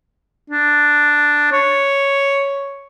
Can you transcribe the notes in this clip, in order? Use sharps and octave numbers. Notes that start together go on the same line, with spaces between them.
D4
C#5